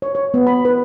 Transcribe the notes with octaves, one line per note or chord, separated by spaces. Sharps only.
C#5
C#5
B3
B5
B4